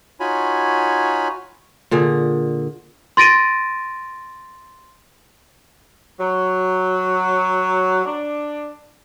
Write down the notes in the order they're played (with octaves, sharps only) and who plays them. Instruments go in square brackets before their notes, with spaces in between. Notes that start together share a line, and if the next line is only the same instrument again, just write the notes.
[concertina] D#4 F4 F#4 C#5 G#5 B5
[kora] A#2 D3 G#4
[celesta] C6 A6 A#6 D7 D#7
[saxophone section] F#3
D4